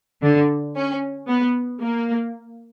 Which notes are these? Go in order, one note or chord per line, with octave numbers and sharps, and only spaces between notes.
D3
C#4
B3
A#3